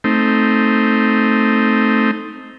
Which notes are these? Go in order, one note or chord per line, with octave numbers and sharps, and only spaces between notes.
A3 C4 D#4